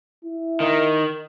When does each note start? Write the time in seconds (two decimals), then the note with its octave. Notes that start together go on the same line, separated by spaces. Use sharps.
0.24 E4
0.60 D#3